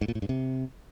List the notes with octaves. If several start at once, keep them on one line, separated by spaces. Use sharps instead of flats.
G#2
A#2
A2
G2
C3